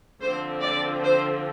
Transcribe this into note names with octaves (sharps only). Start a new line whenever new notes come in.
D3 F3 C4 C5
D5
C5